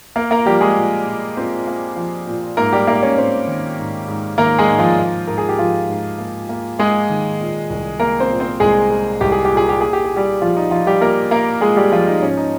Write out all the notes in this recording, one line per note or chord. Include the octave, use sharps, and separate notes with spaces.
A#3 A#4
A#3 A#4
F3 G3 G4
G#3 G#4
A#2
A#2
A#2 C4 C5
A#3
F3
A#2
G#2 A#3 A#4
G3 G4
G#2 A#3 A#4
C#4 C#5
G#2 C4 C5
D#3
G#2
G#2
D#3 A#3 A#4
G#3 G#4
G#2
F3 F4
A#3
G#2 A#4
G#4
G4
G#2 F3 F4
G#2
A#3
A#3
G#3 A#3 G#4
D#3
A#2
C2
G#3 A#3 A#4
C4 C5
A#2
C4 C5
C2 G#3 G#4
G#3
C2 G4
G#4
G4
A#2
G#4
G4
A#3 G#4
G4
G#4
A#2
G3 G4
A#2 F3 F4
D#4
F3 F4
G3 G4
F3 A#3 A#4
A#3 A#4
G#3 A#3 G#4
G3 G4
F3 F4
D#4
G#2 C#4
D#4